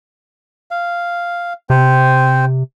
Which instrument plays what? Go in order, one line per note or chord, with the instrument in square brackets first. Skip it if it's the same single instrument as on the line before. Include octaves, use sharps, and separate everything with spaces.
[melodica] F5
[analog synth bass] C3 [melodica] C4 C5